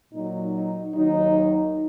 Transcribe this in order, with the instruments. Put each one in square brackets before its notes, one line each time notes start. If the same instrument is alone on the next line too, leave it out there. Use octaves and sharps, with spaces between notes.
[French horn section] A#2 F#3 D#4
D#4
D#2 D#3 F#3 D#4